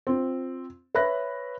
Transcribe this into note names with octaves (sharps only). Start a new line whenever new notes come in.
C4 F4
B4 C#5 E5 B5 F#6 A#6